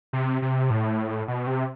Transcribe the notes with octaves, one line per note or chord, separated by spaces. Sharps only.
C3
C3
A2
B2
C3